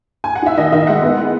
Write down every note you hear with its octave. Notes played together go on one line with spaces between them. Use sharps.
G#5
F#5
D#4 E5
D#3 D#5
D#3 E5
G#3 F#5
B3
E4